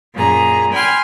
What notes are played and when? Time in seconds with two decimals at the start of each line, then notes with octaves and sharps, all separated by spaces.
0.15 F#2 A#2 G#4 A#5
0.73 G5 G#5 B5 C6 F6